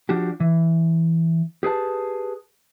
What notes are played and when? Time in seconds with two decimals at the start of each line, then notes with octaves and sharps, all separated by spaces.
0.09 F3 D4 F#4 G4
0.40 E3
1.63 G4 G#4 B4 A5